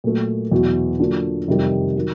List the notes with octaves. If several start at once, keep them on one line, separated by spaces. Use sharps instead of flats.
A#2 F#3 A3
E2 B2 F#3
D3 F#3 A#3 D4 F4
F2 C3 D#3 G3
D#3 F#3